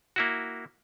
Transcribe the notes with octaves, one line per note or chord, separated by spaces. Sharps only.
A#3 E4 F#4